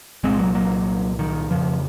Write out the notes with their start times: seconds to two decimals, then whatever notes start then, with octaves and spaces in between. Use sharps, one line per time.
0.23 C2 A#2 G#3 C4
0.39 F#3 A#3
0.55 F#3 A#3
1.19 D#3
1.50 F2 C#3 F3